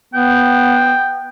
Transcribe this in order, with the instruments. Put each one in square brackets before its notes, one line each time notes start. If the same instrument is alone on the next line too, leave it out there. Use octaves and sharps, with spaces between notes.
[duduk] B3 [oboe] G5